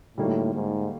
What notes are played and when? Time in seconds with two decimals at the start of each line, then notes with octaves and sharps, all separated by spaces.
0.17 A2 D3 G3 A#3 D#4 F#4
0.55 G#2